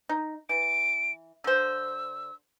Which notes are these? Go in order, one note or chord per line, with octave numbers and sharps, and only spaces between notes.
D#4
E3 D7
D3 C5 E6